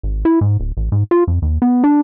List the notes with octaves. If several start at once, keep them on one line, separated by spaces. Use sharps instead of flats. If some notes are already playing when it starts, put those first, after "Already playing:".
G#1
E4
G#2
D1
A1
G#2
F4
F2
D#2
B3
D4